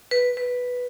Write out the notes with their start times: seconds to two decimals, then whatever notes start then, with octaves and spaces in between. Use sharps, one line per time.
0.11 B4
0.37 B4